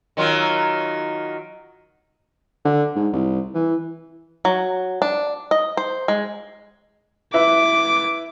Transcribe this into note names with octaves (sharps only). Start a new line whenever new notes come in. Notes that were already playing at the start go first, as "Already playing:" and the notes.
D#3 F#3 F4
D3
G#2
C2
E3
F#3
D4
D#5
C5
G#3
E4 B4 E5 D6